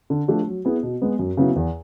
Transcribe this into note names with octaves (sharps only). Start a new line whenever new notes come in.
D3
F3 A3 D4 G4
F#3
B3 E4 G#4
B2
G#3 B3
F#2
C#3 F#3 B3 E4
E2